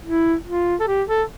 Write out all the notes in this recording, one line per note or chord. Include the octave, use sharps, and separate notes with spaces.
E4
F4
A4
G4
A4